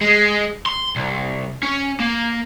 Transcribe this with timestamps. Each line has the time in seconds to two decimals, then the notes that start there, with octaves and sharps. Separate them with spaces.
0.01 G#3
0.66 C6
0.96 C2
1.63 C#4
2.00 A#3